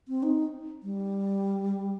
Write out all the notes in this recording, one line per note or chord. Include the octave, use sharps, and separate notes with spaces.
C4
D#4
G3